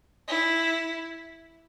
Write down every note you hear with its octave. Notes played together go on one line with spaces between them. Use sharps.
E4